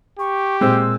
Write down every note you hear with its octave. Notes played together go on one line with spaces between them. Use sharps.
G4 C#6
A#2 G#3 C4 E6